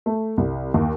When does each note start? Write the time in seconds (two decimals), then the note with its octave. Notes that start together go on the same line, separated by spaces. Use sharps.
0.06 A3
0.37 C2
0.74 D#2